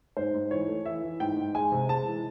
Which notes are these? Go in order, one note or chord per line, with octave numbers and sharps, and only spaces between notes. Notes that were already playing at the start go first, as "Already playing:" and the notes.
G#2 C5
G#2
E3 C#5
A3
E3 E5
E3
G#2 G5
G#2
G#3 G#5
C3
G#3 A5
E3